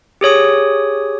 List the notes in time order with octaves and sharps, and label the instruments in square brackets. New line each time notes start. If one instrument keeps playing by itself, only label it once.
[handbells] G4 G#4 C#5 D#6